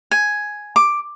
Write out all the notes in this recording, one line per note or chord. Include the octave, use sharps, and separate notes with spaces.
G#5
D6